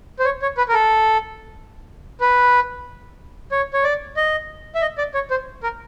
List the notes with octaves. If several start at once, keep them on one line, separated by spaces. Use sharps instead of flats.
C5
C#5
C#5
B4
A#4
A4
B4
C#5
C#5
D5
D#5
E5
D#5
D5
C#5
C5
A#4